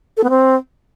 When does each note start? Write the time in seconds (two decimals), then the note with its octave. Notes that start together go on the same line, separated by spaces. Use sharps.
0.17 A4
0.23 B3
0.29 C4